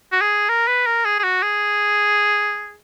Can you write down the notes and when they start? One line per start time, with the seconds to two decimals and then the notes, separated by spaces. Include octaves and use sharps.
0.12 F#4
0.21 G#4
0.49 A#4
0.68 B4
0.86 A#4
1.05 G#4
1.19 G#4
1.24 F#4
1.43 G#4